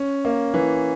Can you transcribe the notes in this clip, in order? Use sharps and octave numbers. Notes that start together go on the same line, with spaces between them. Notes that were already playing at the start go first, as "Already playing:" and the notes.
Already playing: C#4
A#3
E3